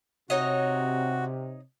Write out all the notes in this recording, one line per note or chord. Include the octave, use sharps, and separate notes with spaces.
C3 D#4 F#4 C#5 D#5